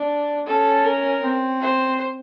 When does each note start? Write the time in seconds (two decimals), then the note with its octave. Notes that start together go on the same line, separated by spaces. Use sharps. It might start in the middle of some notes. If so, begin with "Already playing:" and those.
Already playing: D4
0.47 C#4 A4
0.84 A#4
1.22 C4
1.61 C5